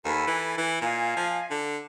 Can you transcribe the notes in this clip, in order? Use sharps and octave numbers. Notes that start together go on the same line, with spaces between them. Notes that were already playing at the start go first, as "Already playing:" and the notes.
D#2 A4 B4 G#5
E3
E3
A#2 D#5 F5 G#5
F3
D3